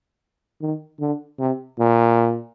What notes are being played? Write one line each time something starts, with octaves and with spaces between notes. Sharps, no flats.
D#3
D3
C3
A#2